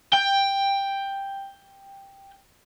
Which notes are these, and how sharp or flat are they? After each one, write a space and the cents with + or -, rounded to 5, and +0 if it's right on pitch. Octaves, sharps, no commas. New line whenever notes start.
G5 +10